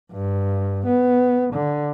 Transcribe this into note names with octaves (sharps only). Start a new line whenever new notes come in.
G2
B3
D3